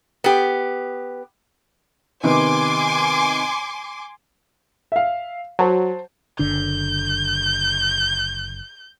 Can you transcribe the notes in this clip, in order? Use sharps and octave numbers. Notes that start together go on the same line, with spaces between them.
B3 G4
C3 D#3 B3 G#5 C6 D6
E5 F5
F#3 C5 A5
F#1 D3 D4 G6